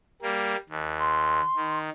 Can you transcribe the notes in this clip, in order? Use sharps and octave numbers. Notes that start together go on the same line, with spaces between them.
G3 A#3
D#2
C6
D#3